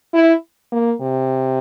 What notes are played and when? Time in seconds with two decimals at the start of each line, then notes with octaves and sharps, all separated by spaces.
0.13 E4
0.72 A#3
1.01 C3